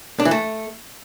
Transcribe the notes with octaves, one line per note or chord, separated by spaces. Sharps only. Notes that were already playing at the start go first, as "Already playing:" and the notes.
D4
E3
A3